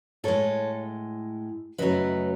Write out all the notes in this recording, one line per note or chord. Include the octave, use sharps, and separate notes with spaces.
A2 G#3 A4 C#5
F#2 C#3 F#3 A3 B4 D#5